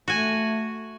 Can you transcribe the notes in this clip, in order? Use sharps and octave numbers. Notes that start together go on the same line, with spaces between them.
A3 F#4 G#5